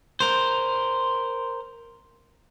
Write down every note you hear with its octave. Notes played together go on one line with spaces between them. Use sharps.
A#4 C5